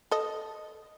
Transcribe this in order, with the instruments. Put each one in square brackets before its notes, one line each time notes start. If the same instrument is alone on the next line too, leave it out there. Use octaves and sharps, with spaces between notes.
[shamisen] A4 D#5